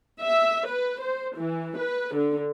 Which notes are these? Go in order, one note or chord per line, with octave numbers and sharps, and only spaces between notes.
E5
B4
C5
E3
B4
D3